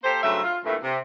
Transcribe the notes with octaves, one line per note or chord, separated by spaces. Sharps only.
A#3 G4 A4 C5
G2 C#3 F#3 A3 C5 E5
F4
G2 A#2 E3 A3
C3